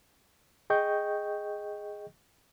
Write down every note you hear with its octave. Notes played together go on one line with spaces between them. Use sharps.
G#4 D#5 G5 C#6 G6